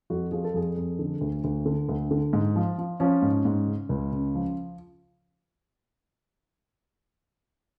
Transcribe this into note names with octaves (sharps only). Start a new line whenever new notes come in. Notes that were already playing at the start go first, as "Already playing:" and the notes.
F2 F#4
F3 G#4
A4
F2 G#4
F2
D3
D2
D2
D3
D2
D3
G#2
F3
F3
F3 C#4
G#2
G#2
C#3
C#2
C#3
F3